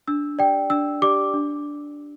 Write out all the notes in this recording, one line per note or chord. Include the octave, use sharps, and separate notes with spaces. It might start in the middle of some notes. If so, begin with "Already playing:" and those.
D4 E6
G4 D5 G5
D4 E6
G4 D5 D6
D4